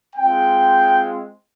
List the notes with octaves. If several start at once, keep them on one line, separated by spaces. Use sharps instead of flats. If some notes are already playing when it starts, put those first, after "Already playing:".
G#3 C4 F4 G5